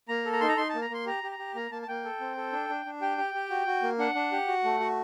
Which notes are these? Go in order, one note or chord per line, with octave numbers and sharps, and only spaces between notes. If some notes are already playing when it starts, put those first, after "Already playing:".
A#3 A#5
A4
A#5
D#4 C6
A#5
D#4 C6
A5
A#3
A#5
A#3 C6
G4 A#5
G4
A#5
G4
A#3 A#5
A#3 A5
A5
A#3 G5
A4
C4
A4
D4
D4
D4
G4 G5
G4
G4
F#4
F#4
A#3
D4 F#5
D4
G4
F#4
A3
F#4